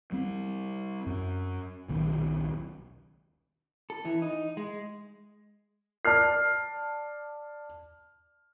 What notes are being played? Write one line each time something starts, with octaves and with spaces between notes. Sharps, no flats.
G3 C4
F#2
D#1 B1 D#3
A4
E3
D#4
G#3
D5 A5 F6 C7